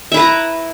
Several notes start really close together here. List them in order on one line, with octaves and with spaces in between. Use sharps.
E5 E4 B4 A#5